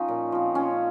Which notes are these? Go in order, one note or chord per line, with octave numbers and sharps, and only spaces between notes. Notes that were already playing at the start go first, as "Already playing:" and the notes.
Already playing: F3 C#4 D#4
A#2
F3 C4
A#2 C#4